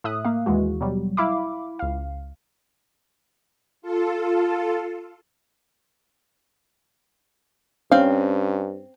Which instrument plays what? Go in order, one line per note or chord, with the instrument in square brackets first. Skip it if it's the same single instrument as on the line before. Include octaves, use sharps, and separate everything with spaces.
[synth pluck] A2 E5 D#6 F#6
A#3 F5
D#2 E3 G#3 F#4
B2 F#3 G3
E4 E5 F5 B5 D6
C#2 F5
[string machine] F4 A4
[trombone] G2 [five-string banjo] C4 F5 [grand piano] C#4